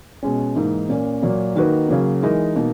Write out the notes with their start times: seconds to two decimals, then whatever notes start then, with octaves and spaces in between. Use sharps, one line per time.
0.23 B2 G#3 C#4
0.56 G#2 E3 A#3 D#4
0.89 A#2 A#3 C#4
1.22 A#2 F#3 A#3
1.56 D#3 A#3 D#4 F#4 B4
1.88 C#3 F#3 A#3
2.23 E3 G#3 D#4 A#4
2.56 B2 A#3 D#4